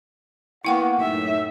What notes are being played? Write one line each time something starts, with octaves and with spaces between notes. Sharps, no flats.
A#3 B3 E4 F#5 G5 C#6
F#2 A2 D#4 E5